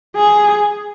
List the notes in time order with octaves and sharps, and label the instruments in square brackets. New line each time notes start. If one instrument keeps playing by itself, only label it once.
[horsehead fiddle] G#4